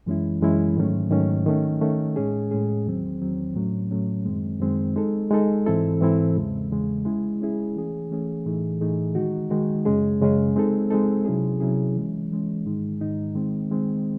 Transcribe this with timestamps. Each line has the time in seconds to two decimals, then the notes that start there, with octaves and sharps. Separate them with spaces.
0.06 F#2 E3 G#3 C#4 E4
0.41 F#2 E3 G#3 C#4 E4
0.77 G#2 D#3 F#3 A3 C#4
1.11 G#2 D#3 F#3 A3 C#4
1.46 D#3 A3 C#4
1.81 D#3 A3 C#4
2.16 A2 G#3 C#4 G#4
2.51 A2 G#3 C#4 G#4
2.86 E2 D#3 F#3 C4
3.22 E2 D#3 F#3 C4
3.56 A2 F#3 A3 C#4
3.91 A2 F#3 A3 C#4
4.26 F#2 D#3 G#3 C4
4.60 F#2 D#3 G#3 C4
4.96 G#3 D#4 A4
5.31 G#3 D#4 A4
5.66 G#2 E3 C4 E4 A4
6.01 G#2 E3 C4 E4 A4
6.36 E2 C#3 G#3
6.71 E2 C#3 G#3
7.05 G#3 C#4 E4 G#4
7.41 G#3 C#4 E4 G#4
7.76 E3 A3 C#4 G#4
8.10 E3 A3 C#4 G#4
8.45 A2 E3 A3 D#4 G#4
8.81 A2 E3 A3 D#4 G#4
9.15 D#3 G#3 D#4 F#4
9.50 D#3 G#3 D#4 F#4
9.85 F#2 C#3 G#3 C#4 G#4
10.20 F#2 C#3 G#3 C#4 G#4
10.56 G#3 C4 D#4 A4
10.91 G#3 C4 D#4 A4
11.25 C3 F#3 C#4 E4 G#4
11.60 C3 F#3 C#4 E4 G#4
11.95 E3 G#3 C#4
12.31 E3 G#3 C#4
12.65 G#2 D#3 G#3 D#4
13.01 G#2 D#3 G#3 D#4
13.35 D#3 G#3 C4
13.71 D#3 G#3 C4